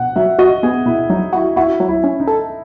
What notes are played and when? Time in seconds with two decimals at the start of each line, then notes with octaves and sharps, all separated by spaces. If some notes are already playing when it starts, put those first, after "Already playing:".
Already playing: B2 F#5
0.16 F#3 E5
0.39 F#4 D#5
0.63 B3 G#4
0.86 B2 E4
1.10 F#3 D#4
1.33 E4 F#4
1.56 E4 F#4
1.80 F#3
1.89 E4
2.04 C#4
2.20 D#4
2.27 A4